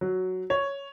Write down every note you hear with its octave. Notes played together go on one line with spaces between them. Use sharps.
F#3
C#5